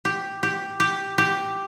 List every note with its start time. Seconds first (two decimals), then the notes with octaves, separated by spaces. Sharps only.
0.05 G4
0.43 G4
0.80 G4
1.18 G4